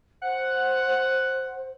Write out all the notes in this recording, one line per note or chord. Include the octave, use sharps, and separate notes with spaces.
C5 F#5